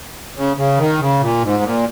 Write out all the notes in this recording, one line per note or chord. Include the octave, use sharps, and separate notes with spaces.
C#3
C#3
D#3
C#3
A#2
G#2
A#2